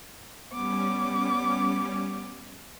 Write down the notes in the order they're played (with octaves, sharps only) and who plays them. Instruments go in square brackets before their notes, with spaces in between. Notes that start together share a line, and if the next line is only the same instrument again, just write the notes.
[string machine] G3 C#4 [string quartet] B3 D6